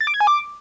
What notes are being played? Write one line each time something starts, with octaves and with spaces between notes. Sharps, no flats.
A6
D6
G#6
G#5
D6